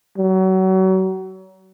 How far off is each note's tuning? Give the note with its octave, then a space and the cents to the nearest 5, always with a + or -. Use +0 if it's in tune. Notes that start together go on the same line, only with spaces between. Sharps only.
F#3 +30